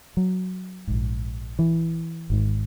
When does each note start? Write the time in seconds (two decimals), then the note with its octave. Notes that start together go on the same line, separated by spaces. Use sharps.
0.17 F#3
0.87 A#1 G#2
1.59 E3
2.30 G#1 G#2